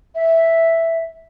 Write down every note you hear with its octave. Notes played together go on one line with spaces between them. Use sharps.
E5